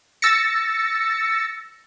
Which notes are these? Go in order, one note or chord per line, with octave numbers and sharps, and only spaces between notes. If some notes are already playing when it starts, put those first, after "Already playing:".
E6 A6 A#6 C#7